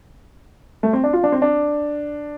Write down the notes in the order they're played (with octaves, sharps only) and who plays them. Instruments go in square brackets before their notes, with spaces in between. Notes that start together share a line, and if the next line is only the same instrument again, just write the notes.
[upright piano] A3
C4
D4
F4
D4
C4
D4